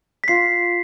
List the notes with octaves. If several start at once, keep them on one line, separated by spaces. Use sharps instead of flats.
B6
F4 C7